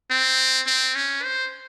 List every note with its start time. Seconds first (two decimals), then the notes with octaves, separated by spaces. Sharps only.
0.11 C4
0.67 C4
0.95 C#4
1.23 C5